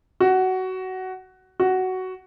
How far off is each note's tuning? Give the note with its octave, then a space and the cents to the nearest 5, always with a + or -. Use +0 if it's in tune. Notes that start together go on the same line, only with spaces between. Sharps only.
F#4 +15
F#4 +10